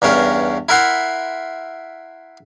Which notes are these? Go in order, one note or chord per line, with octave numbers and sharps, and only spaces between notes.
E2 G2 C#4 A#4
E4 A#4 E5 F#5 C6